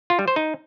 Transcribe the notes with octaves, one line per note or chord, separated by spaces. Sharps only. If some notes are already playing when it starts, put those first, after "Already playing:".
F4
G3
C5
D#4